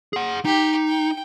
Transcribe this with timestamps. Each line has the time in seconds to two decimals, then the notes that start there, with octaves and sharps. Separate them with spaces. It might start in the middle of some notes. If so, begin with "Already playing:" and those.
0.13 G#4 F#5
0.45 D#4 G4
0.88 G5